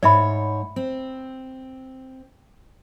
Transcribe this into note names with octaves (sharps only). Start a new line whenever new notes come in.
G#2 C#5 D5 E5 B5
C4